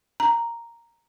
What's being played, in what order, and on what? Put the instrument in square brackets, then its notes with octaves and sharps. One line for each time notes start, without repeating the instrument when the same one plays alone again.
[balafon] A#5